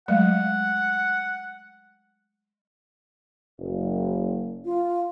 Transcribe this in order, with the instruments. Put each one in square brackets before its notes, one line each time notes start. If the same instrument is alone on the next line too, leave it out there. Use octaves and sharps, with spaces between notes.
[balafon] F#3 G#3 A3 [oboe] F#5
[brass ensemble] F#1
[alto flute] F4